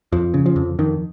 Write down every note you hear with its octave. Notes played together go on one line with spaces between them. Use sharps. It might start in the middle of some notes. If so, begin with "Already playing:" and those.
F2 F3
C#3
F3
F2
F2 D#3